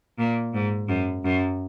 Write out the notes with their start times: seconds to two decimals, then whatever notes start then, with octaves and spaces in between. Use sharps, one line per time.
0.18 A#2
0.54 G#2
0.88 F#2
1.24 F#2